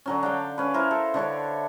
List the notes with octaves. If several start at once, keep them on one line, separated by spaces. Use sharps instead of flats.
D3 F#3 C#4
D4 F5 G5
C#4 B4
E4 A#4 C5
A4
D3 D4 C#5 D5